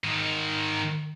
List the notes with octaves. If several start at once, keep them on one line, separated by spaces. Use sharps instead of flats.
G#2 D#3